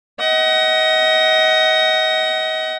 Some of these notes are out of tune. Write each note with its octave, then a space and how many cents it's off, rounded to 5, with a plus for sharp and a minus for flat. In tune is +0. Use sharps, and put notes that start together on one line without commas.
D#5 +25 F#5 +25